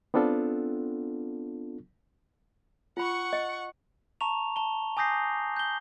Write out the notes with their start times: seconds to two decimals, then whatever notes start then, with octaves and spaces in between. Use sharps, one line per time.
0.14 B3 C4 D4 F4 A4
2.97 F4 F#5 B5 C#6
3.33 D#5
4.21 A5 A#5 C#6 F7
4.56 A5 G7
4.97 G#5 D6 D#6 G6 A#6 C7
5.56 G6 G7